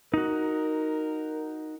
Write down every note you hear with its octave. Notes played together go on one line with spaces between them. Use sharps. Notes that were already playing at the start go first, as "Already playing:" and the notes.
D#4 F#4 A#4